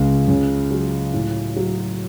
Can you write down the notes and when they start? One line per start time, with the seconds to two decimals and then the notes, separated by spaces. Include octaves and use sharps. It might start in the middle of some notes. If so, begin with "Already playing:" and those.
Already playing: C#2 C#3
0.28 C#3
0.71 F#3
1.13 A2
1.56 F#3